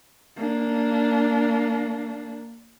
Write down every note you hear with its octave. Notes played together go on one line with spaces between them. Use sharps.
A#3 D4